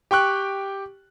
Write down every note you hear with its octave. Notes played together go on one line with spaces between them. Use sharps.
G4 G5 C#6 F#6